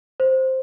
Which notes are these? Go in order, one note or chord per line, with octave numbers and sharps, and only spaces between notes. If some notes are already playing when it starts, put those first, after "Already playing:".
C5